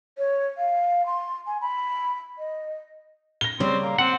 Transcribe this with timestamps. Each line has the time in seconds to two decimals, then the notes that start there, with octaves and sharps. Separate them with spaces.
0.18 C#5
0.58 F5
1.06 C6
1.47 G#5
1.61 B5
2.38 D#5
3.41 A#6 G7
3.60 C#3 G3 C4
3.83 A#3
3.98 C4 F#5